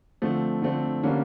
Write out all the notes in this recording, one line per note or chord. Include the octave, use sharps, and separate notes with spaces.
D3 F3 A3 C4
D3 F3 A3 C4
D3 G3 A#3 C#4